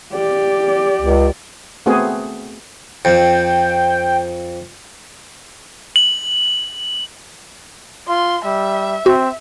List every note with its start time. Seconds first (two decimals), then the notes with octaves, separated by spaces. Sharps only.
0.13 G4 D5
1.01 C#2
1.86 A3 B3 C4 F#4 G#4
3.05 F2 G5
5.96 F#7
8.09 F4 C6
8.45 G3 E5
9.06 C4 F#4